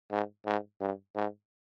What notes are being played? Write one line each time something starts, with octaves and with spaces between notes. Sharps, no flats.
G#2
G#2
G2
G#2